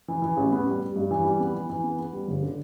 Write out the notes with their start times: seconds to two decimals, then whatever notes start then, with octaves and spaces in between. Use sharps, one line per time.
0.08 E3
0.22 E3
0.37 A1
0.52 B3
0.66 G3
0.81 G3
0.96 G2
1.11 E3
1.25 G3
1.40 B3
1.54 E3
1.70 E3
1.84 B3
1.98 B3
2.13 G3
2.28 G1
2.42 D3